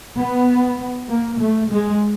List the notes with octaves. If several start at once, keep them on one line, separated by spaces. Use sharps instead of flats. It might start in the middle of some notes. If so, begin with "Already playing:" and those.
B3
A#3
A3
G#3